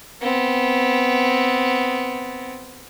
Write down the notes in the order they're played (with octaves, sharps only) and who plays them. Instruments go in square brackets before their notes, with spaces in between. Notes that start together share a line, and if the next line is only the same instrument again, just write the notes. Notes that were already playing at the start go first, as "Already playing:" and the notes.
[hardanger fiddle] B3 C4